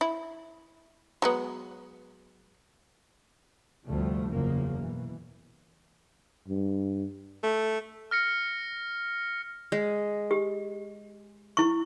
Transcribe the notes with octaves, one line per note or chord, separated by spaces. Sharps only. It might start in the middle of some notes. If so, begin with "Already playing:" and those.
E4
F#3 G#3 B3
D2 G2 C3 F3 G3 A3
F#1 E2 C#3 F3 A#3
B2 E3
G2
A3
F6 A#6 C#7
G#3
G4
E4 C#6